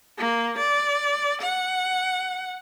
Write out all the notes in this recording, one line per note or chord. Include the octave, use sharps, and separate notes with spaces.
A#3
D5
F#5